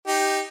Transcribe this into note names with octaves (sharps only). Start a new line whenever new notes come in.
D#4 G4